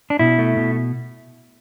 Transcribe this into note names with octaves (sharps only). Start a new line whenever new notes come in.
D4
B2 E4
A3
B2